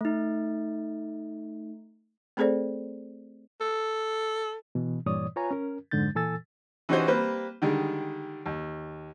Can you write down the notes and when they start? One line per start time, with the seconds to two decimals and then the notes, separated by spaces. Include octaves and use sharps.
0.01 A3 D#4
2.37 A3 C4 G#4 A4 C5 D5
3.61 A4
4.75 B2 E3
5.06 G2 A#2 E3 C#5 D5 D#6
5.36 F4 B4 C#5 G#5 A#5
5.51 C#4 A#4
5.91 F2 G#2 D3 G#3 G6 A6
6.16 A#2 E3 A4 G#5 E6 A6
6.89 E3 C#4 D#4 F#4 G4 C5
7.07 G3 A#3 C4 B4 C5
7.62 D3 D#3 G3 G#3
8.46 D#2